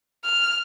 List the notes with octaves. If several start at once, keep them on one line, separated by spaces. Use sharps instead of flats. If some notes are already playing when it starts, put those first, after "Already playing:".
F6